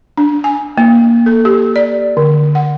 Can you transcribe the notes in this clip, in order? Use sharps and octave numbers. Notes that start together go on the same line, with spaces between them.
D4
G#5
A#3
A4
G4
D5
D3
F#5